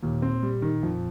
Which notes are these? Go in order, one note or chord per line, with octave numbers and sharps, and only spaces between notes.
D#2 A#2
C4
G3
D#3
F2